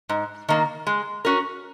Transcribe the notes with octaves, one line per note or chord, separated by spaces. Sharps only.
G#2
D#3 A#3
G#3
C#4 F#4 A#4